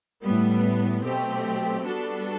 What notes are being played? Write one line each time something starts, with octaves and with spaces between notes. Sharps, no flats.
A2 G3 B3
B2 F#3 A3 C4 G4
G3 B3 D4 F#4 A4